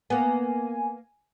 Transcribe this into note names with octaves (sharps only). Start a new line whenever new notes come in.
A#3 B3 G#5